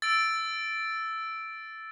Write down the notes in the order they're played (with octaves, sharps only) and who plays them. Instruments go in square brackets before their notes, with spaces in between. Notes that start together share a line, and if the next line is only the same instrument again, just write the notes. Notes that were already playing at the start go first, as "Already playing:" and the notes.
[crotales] E6 A6 D7